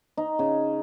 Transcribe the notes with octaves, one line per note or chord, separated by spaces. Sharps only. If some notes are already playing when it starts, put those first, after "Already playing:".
D#4
C#3